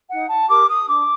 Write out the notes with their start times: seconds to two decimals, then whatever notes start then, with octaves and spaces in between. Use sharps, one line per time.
0.09 D#4 F#5
0.29 A5
0.47 G4 A#4 D6
0.67 D#6
0.87 D4 D6